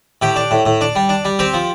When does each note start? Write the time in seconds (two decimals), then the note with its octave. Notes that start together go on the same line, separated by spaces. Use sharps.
0.22 A2 G4
0.36 D4
0.51 A2
0.66 A2
0.81 D4
0.96 G3
1.09 D4
1.25 G3
1.39 C4 G4
1.54 F3